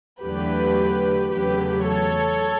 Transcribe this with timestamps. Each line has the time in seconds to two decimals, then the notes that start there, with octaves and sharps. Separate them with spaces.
0.23 E2 D3 F#3 A3 G4 B4
1.33 E2 C#3 F#3 A3 G4 B4
1.87 A4 C#5